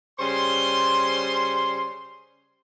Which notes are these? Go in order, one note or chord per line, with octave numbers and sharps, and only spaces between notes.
C#3 G3 C5 C6